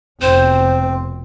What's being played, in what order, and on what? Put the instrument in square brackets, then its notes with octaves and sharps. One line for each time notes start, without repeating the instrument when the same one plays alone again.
[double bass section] F1 B2 [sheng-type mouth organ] C4 [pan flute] C5